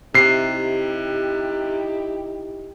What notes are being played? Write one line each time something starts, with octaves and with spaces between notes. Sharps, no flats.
C3 D#4 E4 G4 C7